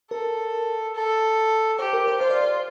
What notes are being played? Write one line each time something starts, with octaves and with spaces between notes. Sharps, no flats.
A4 A#4
A4
G4 C5
A#4
C5
F4 C5
D5
C5